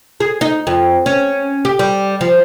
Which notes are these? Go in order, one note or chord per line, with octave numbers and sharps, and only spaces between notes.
G#4
D#4
F2
C#4
G4
G3
F3